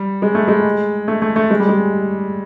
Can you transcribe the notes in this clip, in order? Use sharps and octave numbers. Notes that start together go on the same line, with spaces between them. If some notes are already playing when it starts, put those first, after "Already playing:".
Already playing: G3
G#3
A3
G#3
A3
A3
A3
G#3
G3
G#3